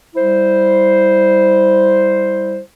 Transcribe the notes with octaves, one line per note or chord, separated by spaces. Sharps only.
G3 E4 C5